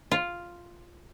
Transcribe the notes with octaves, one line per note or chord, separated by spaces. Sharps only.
F4